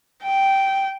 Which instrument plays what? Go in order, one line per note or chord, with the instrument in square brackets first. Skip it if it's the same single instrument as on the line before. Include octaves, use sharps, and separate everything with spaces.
[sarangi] G5